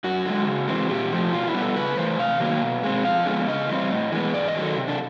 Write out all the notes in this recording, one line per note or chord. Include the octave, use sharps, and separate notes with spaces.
F#2 F#4
D3 F3 G#3
C#3
E3 G#3 C4
A#2 G4
F3 A3
B2 F4
E4
G3 B3
A4
C#3 B4
E3 A3 C5
C3 F5
D#3 F#3 A#3
B2
G#3 C4
F2 F5
D3 F3 G#3 B3
C#3 D#5
E3 G3 C4
A2
E3 G#3 B3
G#2 D5
D#5
D#3 F#3
A4
C3
D4